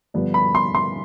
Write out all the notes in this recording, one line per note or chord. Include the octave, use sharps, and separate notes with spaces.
G2 D3 F3 B3 D4
B5
C6
C6